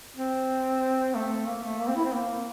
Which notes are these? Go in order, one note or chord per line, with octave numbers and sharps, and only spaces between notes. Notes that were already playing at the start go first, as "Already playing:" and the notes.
C4
A3
A#3
A3
A#3
C4
E4
C4
A#3